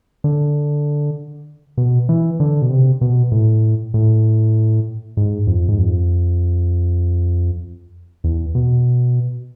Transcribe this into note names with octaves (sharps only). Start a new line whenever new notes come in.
D3
B2
E3
D3
B2
C3
B2
A2
A2
G#2
F2
G#2
F2
E2
B2